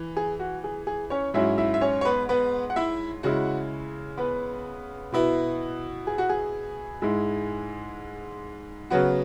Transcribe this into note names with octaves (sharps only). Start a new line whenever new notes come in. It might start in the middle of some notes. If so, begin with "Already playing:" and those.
Already playing: E3
G#4
F#4
G#4
G#4
C#4 C#5
G#2 F#3 C#4 E4 E5
E4 E5
E5
C#4 C#5
C#5
B3 B4
B3 B4
F#5
E4 E5
C#3 G#3 E4 F#4 F#5
B3 B4
B2 B3 E4
G#4
F#4
G#4
G#2 G#3 E4
C#3 F#3 B3 F#4